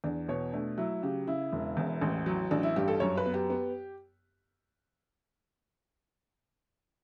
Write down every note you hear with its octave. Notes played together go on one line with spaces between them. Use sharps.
E2 D4
B2 C#5
A3 D4
F#3 E4
C#3 G4
C#3 E4
E1
E2
A1
F#3
A1 D4
E4
G2 G4
A4
F#2 C#5
B4
B3
G4
B3